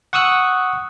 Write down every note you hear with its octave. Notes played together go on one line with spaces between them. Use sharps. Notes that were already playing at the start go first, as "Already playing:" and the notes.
F#5 C#6 D#6 E6 F#6